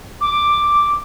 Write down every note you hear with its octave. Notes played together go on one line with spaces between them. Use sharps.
D6